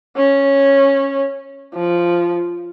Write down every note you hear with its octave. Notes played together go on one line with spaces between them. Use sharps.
C#4
F3